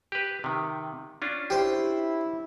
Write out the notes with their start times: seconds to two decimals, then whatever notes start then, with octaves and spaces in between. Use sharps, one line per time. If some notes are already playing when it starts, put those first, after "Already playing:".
0.12 G4 B4
0.44 C3 D#3
1.22 C#4 D4 F4
1.50 E4 G4 C5